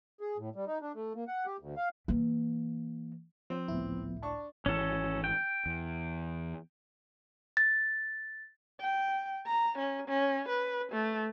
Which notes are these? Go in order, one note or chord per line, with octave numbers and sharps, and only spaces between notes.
G#4
A2
G3
D#4
D4
A3
A#3
F#5
G4
D2
F5
E3 A#3
F3 C4
G#1 C#2 A2 F3 B3 E4
D4 A5 C#6
G#1 E3 C#4 A4
G5
E2
A6
G5
A#5
C#4
C#4
B4
A3